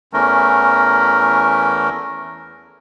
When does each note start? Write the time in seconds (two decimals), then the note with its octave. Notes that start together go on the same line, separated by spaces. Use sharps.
0.13 E2 E3 A3 C#4 A#4